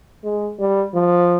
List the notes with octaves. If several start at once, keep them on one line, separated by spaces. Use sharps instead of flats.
G#3
G3
F3